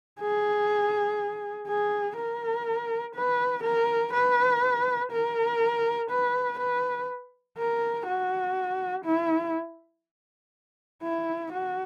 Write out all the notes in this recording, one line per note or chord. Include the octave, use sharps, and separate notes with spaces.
G#4
G#4
A#4
B4
A#4
B4
A#4
B4
B4
A#4
F#4
E4
E4
F#4